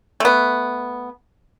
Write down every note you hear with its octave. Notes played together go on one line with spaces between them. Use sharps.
A3 B3